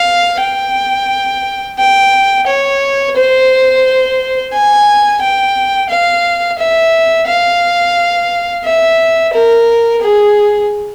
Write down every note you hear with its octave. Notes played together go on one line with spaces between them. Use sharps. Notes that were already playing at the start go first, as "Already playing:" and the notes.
Already playing: F5
G5
G5
C#5
C5
G#5
G5
F5
E5
F5
E5
A#4
G#4